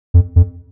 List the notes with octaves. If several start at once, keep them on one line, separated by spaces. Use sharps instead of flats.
F2
F2